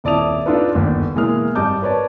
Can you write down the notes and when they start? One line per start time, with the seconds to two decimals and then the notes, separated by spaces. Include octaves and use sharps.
0.04 D#1 E4 D5 A5 D#6 F7
0.46 D4 D#4 F4 A4 B4
0.74 G1 D#2
1.15 B2 E3 G#3 A#3 G#4 F6
1.55 G#1 G3 D#5 A5 D6 G6
1.82 A#4 B4 C#5 D5 A5